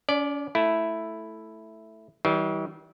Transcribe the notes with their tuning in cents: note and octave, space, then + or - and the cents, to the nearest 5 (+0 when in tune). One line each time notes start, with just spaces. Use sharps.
C#4 +40 D5 +0
A3 +0 E4 +0
E3 -45 G3 -30